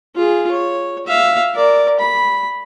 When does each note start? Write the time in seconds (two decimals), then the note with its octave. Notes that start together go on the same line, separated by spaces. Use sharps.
0.15 F4 G#4
0.51 C#5
1.06 E5 F5
1.55 A#4 D5
2.00 B5